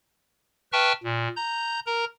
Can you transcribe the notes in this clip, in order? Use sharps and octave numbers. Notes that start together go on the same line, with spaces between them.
B4 E5 G5 A5 C#6 F6
A#2
A#5 G6
A#4 A#5